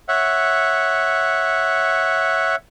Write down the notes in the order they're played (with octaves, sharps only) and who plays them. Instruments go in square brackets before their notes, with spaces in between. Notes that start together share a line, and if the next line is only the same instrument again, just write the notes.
[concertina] C#5 E5 F#5